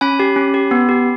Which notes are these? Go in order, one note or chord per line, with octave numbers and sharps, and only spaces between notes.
C#4 G#5 B5
G4
C#4
G4
B3
G4